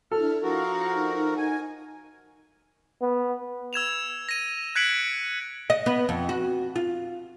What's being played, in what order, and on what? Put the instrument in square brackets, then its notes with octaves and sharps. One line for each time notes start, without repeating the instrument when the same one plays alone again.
[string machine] D4 E4 [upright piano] A4 [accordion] F6
[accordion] F3 F#4 A#4 [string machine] F5 F#5 C#6
[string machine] D#4
[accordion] G#5
[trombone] B3
[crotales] E6 G#6 E7 F7
A#6 D#7
F#6 G#6 B6 C#7 D7 F#7
[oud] D#5
B3
F2
F#4
F4